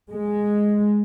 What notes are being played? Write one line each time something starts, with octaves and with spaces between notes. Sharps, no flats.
G#3